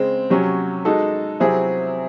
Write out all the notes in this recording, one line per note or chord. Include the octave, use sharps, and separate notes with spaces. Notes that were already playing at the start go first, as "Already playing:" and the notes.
Already playing: C#3 G#3 C4
C3 F#3 C#4
G#3 D#4 F#4 A4
C3 F#3 C4 E4 G#4